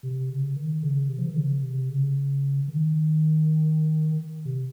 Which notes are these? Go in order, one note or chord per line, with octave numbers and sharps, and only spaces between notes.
C3
C#3
D#3
C#3
C3
F3
D#3
C#3
C3
C#3
D#3
C3